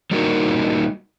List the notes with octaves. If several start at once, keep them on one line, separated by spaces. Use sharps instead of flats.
G3 A#3 D#4 F#4 A#4